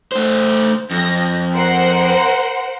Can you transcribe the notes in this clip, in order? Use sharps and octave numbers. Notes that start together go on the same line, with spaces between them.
A3 C5
F2 A#6
A#4 C5 F#5